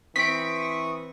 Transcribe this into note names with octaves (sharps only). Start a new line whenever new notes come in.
E3 C4 C#6 D#6 B6 D7